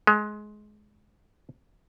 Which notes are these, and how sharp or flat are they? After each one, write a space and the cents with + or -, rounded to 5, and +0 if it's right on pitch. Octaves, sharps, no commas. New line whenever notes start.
G#3 +20